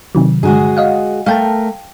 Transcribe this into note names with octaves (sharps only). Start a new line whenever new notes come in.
C3 D#3 F#3
G2 D3 G#3 F#4 G#4
D#5 F5 F#5
A3 A#4 F5 G5 A5